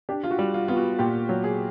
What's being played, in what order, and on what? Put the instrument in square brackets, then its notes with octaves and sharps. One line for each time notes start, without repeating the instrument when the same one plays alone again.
[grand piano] D4 [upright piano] G4
[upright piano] F4
F#4
[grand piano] G3
[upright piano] F4
[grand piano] B3 [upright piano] F4
[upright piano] F#4
[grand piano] A#2 [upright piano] G4
[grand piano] F#3
[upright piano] G#4